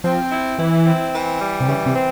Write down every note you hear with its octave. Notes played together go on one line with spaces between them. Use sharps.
F3 C4
E4
E3 E4
C4
E3
G3
C3
C#3 E3
C3
C4